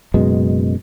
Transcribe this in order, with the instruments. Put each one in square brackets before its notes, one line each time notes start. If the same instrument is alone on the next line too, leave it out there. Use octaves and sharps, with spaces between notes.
[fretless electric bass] F#1 F#2 B2 G#3